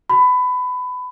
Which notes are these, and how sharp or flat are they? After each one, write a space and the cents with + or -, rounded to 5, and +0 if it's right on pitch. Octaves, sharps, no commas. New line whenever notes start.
B5 +20